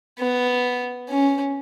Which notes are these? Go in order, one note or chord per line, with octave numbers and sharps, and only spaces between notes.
B3
C#4